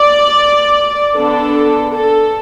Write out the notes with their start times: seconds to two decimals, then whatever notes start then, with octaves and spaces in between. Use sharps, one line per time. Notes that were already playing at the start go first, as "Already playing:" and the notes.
Already playing: D5
1.16 D3 B3 D4 A4
1.94 A4